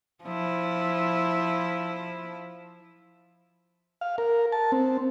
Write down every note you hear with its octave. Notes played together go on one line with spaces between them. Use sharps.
F3 E4
F5
A#4
A5
C4